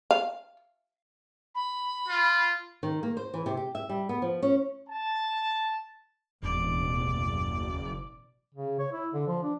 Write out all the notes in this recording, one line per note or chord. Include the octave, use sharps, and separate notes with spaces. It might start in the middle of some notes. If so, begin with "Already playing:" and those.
F5
B5
F4
D#3
A#3
C5
E3
C3
G4
E5
G3
B3
F3
C#4
A5
E1 A1 D#2 B2 D5
F#1
C#3
C#5
E4
D3
F3
D4